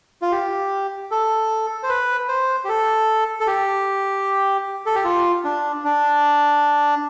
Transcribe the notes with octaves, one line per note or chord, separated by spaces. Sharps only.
F4
G4
A4
C5
B4
C5
G4
A4
A4
G4
A4
G4
F4
D4
D4